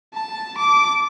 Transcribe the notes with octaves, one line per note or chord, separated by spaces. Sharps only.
A5
D6